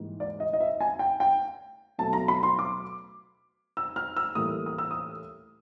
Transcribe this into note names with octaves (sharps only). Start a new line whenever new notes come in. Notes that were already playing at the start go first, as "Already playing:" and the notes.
Already playing: G#2 E3 G3 A#3
D5
D#5
D#5
E5
G#5
G5
G5
B2 F#3 A3 A5
A#5
B5
C6
D6
E6
F6
E6
A2 E3 G3 A#3 D#6
D#6
E6
D#6